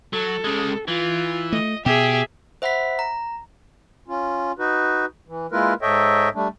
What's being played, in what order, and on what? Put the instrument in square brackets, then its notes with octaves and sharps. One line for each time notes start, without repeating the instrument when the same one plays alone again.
[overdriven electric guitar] F#3 [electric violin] A4
[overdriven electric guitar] C#3 G#3
[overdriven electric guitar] E3 [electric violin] F4
[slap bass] A3 [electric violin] D#5
[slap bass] B2 [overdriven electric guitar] G4 [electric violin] G#4 E5
[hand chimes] C5 E5 F#5 B5 B6
A#5
[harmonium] C#4 F4
D#4 F#4 B4
E3
G#3 A#3 E4 F4 A#4 B4
G#2 A4 C#5 D#5 E5 G5
G3 A3 D4